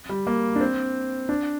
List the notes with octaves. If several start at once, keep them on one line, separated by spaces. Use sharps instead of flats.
G3
A#3
D4
C4
D4